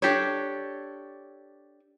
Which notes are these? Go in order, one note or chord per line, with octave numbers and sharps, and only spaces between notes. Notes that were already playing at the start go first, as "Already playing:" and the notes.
D4 G4 A4 C#5